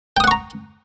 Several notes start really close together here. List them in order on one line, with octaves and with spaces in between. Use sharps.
G5 D#6 F#5 C#6 A#5